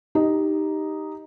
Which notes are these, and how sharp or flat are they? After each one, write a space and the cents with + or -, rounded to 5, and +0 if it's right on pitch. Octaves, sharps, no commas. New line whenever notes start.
D#4 +0 G4 +0